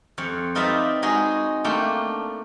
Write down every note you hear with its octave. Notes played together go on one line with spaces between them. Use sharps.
F2 C#5
C4 D#4 F4 B4 D5 E5
G#3 D#4 F#4 G#4
A3 A#3 D4 G5 C6